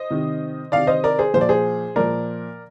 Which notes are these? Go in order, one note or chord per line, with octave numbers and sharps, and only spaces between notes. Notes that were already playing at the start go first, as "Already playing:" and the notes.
Already playing: C5 D#5
C3 D#3
C3 D#3 D5 F5
C5 D#5
A#4 D5
G#4 C5
A#2 F3 C5 D5
G#4 C5
A#2 F3 A#4 D5